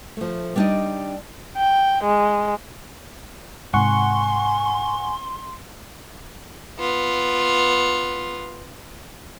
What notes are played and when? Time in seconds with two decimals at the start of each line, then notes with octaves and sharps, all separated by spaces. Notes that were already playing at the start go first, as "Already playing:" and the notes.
0.17 F3 A3
0.56 G3 B3 D4 D#4 D5 D#5
1.57 G5
2.04 G#3
3.74 G#2 C3 F#5 G#5 C6 C#6
6.79 B3 F4